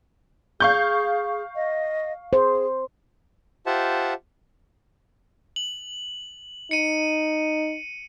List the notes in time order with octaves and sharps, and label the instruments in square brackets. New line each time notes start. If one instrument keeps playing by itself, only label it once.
[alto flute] G#4 [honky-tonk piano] F5 C#6 G6
[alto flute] D#5
[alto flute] G#4 [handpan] C5
[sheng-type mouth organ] F4 G4 C5 E5 F#5 A5
[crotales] F#7
[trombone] D#4 [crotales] C#7 D#7